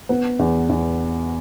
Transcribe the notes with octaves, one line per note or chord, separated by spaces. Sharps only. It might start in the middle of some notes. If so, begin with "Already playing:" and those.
B3
E2
E2